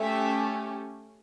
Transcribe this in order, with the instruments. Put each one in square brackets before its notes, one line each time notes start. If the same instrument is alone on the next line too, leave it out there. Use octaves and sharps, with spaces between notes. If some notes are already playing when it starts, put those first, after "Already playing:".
Already playing: [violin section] A3 C#4 G4 E5